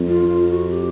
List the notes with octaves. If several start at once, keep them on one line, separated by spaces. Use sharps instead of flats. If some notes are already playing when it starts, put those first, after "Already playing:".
Already playing: F2
F4
F4
F#4
G4